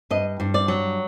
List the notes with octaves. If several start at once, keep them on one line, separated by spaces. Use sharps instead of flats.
G2 D#5
G2
D5
F#3